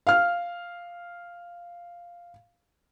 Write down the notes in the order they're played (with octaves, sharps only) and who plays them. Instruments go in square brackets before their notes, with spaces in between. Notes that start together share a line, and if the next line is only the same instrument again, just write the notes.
[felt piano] F5 F6